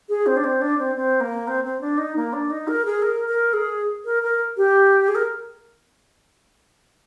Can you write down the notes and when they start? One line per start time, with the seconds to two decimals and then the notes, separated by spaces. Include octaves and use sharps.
0.09 G#4
0.26 C4
0.37 D4
0.44 C4
0.61 D4
0.78 C4
0.96 C4
1.21 A#3
1.48 C4
1.64 C4
1.81 D4
1.98 D#4
2.16 A#3
2.33 D4
2.50 D#4
2.68 A#4
2.85 G#4
3.02 A#4
3.28 A#4
3.53 G#4
4.05 A#4
4.23 A#4
4.57 G4
5.08 G#4
5.15 A#4